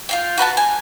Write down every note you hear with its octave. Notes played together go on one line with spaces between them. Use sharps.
F4 F5 G5
F#4 B4 F#5 A5
G#5